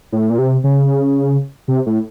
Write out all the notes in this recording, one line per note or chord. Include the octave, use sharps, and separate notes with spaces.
A2
A#2
C3
C#3
C3
A2